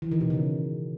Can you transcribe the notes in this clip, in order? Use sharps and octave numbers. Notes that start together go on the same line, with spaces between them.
E3
D#3
B2
C#3